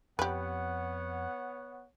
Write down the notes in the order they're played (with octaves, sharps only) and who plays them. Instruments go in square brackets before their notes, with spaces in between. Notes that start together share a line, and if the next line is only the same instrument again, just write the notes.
[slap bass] F2 [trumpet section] B3 C#5 F#5 [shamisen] G4 B4